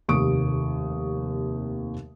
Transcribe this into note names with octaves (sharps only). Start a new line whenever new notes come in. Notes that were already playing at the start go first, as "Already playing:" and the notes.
F1 D#2 C3 C#6 D#6 D7